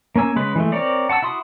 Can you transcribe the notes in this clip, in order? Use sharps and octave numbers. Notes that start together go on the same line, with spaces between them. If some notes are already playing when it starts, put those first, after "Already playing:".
A#3 C#4 G#5 E6
C#3 G#3 B4
E3 G#3 A3
C4 A#4 C#5 D5
F#5 A5 C#6 E6
E4 F#4 C6 D#6